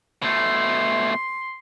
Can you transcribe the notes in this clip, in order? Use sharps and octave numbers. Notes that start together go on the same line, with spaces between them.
B2 A3 C6